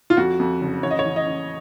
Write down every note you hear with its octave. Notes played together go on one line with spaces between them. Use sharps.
F4
F2 F#4
F2
F#1
A1 C#5
D#5
C#5
A1
D#5
A1